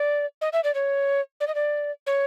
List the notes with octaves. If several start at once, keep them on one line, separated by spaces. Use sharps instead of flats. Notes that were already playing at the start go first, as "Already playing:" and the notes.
Already playing: D5
D#5
E5
D5
C#5
D5
D#5
D5
C#5